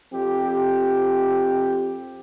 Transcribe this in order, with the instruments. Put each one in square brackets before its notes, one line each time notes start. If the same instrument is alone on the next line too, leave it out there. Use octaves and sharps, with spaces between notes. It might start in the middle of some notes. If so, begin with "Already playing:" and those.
[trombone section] F2 C4 G4